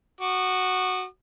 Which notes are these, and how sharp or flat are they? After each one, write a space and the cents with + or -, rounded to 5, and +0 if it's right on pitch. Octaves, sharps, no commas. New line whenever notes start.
F#4 +0 D#6 -45